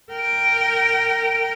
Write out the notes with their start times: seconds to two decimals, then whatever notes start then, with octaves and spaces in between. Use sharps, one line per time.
0.12 A#4 G5